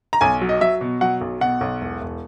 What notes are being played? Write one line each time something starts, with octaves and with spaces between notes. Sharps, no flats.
A#5
B1 G#5
F#3
D#5
F#3 E5
B2
F#3 F#5
B1
B2 F#5
B1
E1
E1